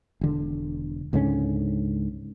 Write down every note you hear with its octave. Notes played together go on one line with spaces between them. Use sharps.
E1 D3
C#2 G#2 D3 C#4